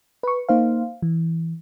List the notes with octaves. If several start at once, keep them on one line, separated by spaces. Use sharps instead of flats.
B4 C#6
A#3 D#4 C5 F5
E3